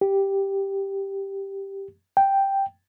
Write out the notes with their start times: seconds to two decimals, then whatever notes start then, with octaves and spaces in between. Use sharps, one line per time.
0.01 G4
2.17 G5